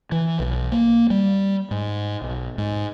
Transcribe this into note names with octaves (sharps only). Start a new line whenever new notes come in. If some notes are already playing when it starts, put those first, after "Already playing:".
E3
B1
A#3
G3
G#2
B1
G#2